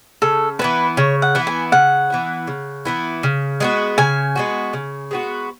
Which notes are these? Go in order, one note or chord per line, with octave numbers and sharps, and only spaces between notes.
C#3 A4
E3 B3 E4 B4
C#3 C#5
F#5
E3 B3 E4
G#5
C#3 F#5
E3 B3 E4
C#3
E3 B3 E4
C#3
G#3 B3 F#4
C#3 G#5
G#3 B3 F#4
C#3
G#3 B3 F#4